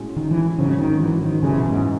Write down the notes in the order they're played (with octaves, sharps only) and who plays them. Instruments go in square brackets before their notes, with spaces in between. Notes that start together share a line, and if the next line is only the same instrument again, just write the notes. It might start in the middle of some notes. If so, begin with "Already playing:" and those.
Already playing: [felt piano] A2 G#3 C#4 F#4
[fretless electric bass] D#3
E3
[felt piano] G#1 G#2 F#3 C#4 F#4 [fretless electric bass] C#3
[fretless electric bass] D#3
E3
D#3
[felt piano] F#2 E3 G#3 C#4 [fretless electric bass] C#3
[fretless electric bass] B2
G#2